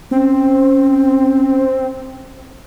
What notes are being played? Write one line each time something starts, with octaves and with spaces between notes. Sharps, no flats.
C4 C#4